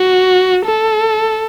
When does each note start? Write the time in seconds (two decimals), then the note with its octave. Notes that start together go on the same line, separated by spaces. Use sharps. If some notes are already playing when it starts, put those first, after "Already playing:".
Already playing: F#4
0.66 A4